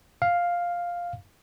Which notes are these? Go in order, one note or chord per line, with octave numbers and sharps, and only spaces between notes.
F5